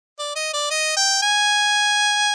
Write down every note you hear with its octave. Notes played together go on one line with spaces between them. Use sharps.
D5
D#5
D5
D#5
G5
G#5